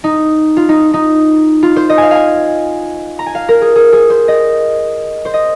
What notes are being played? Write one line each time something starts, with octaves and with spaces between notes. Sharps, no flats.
D#4
F4
D#4
D#4
F4
C5
D#5
F5 G#5
F5 G#5
A#5
G#5
F5
A#4
G#4
G#4
G#4
C5
D#5
C5
D#5